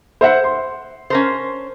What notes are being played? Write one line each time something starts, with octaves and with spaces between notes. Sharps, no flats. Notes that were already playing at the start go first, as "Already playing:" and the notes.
C5 E5 F#5
C6
C#4 A#4 C5